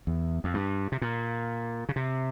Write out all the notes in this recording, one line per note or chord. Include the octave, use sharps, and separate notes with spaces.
E2
F2
G2
C3
A#2
C#3
C3